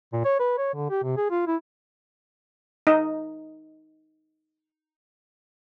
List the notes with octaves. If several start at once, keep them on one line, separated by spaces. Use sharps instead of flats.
A#2
C#5
B4
C#5
D3
G4
C3
G#4
F4
E4
D#4 D#5